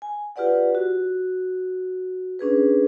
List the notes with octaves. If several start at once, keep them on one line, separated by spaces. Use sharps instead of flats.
G#5
F4 G4 B4 D5 F#5
F#4
C#4 D4 G#4 B4